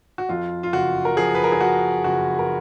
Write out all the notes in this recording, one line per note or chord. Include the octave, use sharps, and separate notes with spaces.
F#4
F2 F4
F4
F#1 F#4
A#4
F3 G#4
B4
A#4
G#4
F3 F#4
F#1 F#4
A#4